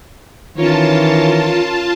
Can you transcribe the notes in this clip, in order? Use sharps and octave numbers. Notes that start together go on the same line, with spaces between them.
D#3 E3 C#4 F4 A#4 C#5 A5